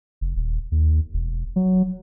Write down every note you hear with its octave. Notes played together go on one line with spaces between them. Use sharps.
F1
D#1
D#2
E1
F#3